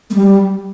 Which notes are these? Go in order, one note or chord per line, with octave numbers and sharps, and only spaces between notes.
A3
G3